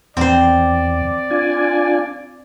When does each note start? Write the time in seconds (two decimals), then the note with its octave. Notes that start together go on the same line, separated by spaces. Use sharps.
0.17 E2 C4 C5 D5
1.30 D4 F4 G#5